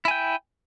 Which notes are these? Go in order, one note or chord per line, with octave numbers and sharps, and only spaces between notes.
E4 G5 G#5